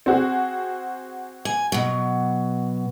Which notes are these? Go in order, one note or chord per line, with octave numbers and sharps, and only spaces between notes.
C4 F#4 G#4
G#5
B2 F#3